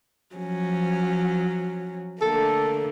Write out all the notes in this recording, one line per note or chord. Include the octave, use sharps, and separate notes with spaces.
F3 F#3 C#4
D3 A3 A#3 A4